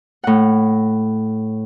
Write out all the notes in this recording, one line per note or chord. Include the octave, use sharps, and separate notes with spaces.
A2 F#5